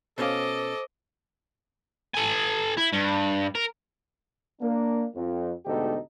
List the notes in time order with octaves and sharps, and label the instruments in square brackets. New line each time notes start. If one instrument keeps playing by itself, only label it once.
[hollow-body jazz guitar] B2 C#4 F5 [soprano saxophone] A4 [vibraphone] C5 [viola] D#5 D6
[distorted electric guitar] A4 G#5
E4
G2
A#4
[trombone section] A#3 D4
F2
D2 G#2 B2 D#4 G4 A4